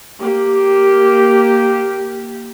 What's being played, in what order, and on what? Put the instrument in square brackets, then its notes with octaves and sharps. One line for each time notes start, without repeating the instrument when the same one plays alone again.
[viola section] A#3 G4